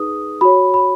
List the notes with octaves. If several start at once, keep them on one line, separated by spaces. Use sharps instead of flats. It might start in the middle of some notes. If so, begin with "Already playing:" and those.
Already playing: D#4 G#4 B4 D#6
F#4 C#5 B5
B5